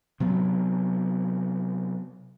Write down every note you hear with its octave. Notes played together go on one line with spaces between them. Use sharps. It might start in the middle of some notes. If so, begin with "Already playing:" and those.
C3 F#3 B3